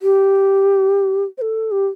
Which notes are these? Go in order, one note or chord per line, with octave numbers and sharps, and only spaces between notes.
G4
C5
A4
G4